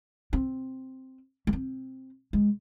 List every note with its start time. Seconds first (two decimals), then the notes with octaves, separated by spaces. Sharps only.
0.33 C4
1.47 A3
1.53 C4
2.33 G#3